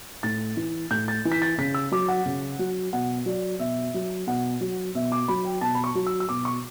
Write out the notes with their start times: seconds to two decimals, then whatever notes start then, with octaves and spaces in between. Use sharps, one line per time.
0.23 A2 A6
0.57 E3
0.91 A2 G6
1.08 A6
1.25 E3
1.32 B6
1.42 A6
1.58 C#3 B6
1.74 E6
1.92 F#3 D6
2.08 F#5
2.26 C#3
2.59 F#3
2.93 B2 F#5
3.26 F#3 D5
3.59 B2 E5
3.94 F#3
4.27 B2 F#5
4.61 F#3
4.95 B2 E5
5.12 D6
5.28 F#3 B5
5.45 G5
5.61 B2 A5
5.75 B5
5.84 C#6
5.95 F#3
6.07 E6
6.20 E6
6.29 B2 D6
6.45 C#6